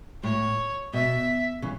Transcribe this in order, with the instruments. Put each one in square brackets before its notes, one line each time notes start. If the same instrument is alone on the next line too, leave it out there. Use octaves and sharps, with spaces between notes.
[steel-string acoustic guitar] A2 [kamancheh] C#5
[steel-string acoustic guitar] B2 [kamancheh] E5
[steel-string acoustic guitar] C#3 E3